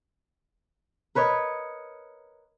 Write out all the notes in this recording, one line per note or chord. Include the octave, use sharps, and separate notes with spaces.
A#4 B4 C#5 D#5